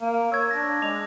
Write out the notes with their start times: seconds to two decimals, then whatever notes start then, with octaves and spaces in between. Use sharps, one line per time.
0.01 A#3
0.32 C#5 E6 G#6
0.51 D4 A#6
0.82 G#3 D6 F7